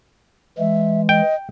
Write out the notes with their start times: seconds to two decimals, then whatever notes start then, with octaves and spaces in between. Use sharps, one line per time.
0.58 E3 G#3 E5
1.09 D#5 G5